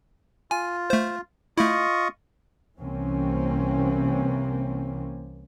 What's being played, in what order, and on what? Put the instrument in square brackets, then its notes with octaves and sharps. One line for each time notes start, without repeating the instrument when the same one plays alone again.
[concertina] F4 [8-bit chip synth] G#5
[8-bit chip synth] A3 C5
[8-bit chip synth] A3 E4 [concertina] F4 D#5 C#6
[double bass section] C2 C3 E3 A#3 C4 C#4